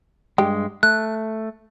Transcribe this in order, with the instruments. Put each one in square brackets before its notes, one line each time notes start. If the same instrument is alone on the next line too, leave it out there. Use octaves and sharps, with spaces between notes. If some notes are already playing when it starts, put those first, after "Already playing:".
[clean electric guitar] G2 G#3 [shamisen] G4
[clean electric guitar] A3 [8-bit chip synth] F#6